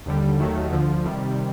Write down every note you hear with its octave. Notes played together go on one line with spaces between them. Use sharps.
D#2 D3 G3
D#2 D#3 F#3 A3
D2 D3 F3
C3 D#3 G3